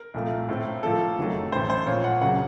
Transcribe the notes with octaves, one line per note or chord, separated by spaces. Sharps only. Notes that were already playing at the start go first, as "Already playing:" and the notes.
Already playing: A#4
C2 A#2 F3 A3
A2 A3 C4
A2 F3 A#3 A4
F#1 F2 D#3 F#3 A3
A1 A2 A3 C5
C5
A#2 F3 C4 F4 C#5
F#5
C#2 C#3 F#3 A#3 F#5